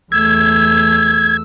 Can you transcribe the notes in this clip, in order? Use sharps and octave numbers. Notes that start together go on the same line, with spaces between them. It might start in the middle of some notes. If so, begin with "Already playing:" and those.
E2 A3 E6 G#6